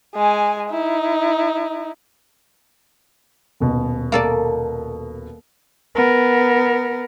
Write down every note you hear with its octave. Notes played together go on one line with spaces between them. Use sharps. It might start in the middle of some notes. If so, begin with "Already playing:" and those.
G#3 G#5
D#4 E4
D#1 B2
A#3 A4 D5
B3 A#4